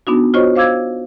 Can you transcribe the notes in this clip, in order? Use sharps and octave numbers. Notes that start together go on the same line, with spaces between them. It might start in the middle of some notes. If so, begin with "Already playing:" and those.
B3 D4 D#4 F#4
F4 F#4 C5 C#5 D#5 C#6
C5 F5 D6 E6 G#6